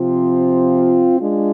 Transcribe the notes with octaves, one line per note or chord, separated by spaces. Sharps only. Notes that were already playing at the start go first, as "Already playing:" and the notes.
Already playing: C3 F3 C4 F4
G#3 D4 F4